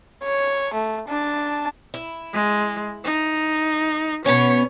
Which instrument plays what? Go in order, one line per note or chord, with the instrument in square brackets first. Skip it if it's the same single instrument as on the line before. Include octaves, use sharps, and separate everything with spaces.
[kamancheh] C#5
A3
D4 A5
[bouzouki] E4
[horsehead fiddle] G#3
D#4
[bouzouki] B2 B3 C#4 [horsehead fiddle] C#5